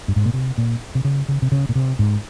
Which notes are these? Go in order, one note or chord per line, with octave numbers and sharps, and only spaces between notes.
G2
G#2
A#2
C3
A#2
C3
C#3
C#3
C3
C#3
A#2
C3
G#2